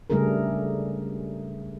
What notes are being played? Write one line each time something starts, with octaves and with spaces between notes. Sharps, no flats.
C#3 G3 A3 D4 G#4 A#4